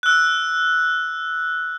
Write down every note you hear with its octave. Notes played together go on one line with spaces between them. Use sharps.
E6 F#6